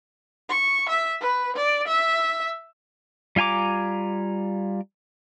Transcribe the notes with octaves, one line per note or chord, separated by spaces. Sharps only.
C#6
E5
B4
D5
E5
G3 F4 G#5 A#5 D6